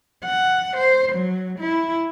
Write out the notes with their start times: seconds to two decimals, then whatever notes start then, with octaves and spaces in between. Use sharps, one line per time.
0.25 F#5
0.77 C5
1.13 F#3
1.59 E4